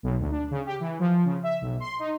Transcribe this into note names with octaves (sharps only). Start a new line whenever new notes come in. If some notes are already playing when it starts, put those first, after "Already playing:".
B1
D2
D4
C#3
G4
E3
F3
C#3
E5
B1
C6
D#4